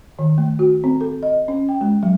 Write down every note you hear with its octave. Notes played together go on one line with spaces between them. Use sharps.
D#3
A3
F#4
C4
A4
D#5
C#4
G5
G#3
F#3